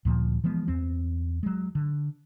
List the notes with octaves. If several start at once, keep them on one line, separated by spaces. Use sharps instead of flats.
D2 A#2 F3
E3 F3 G#3 B3
E2 C4
F#3 G#3
D3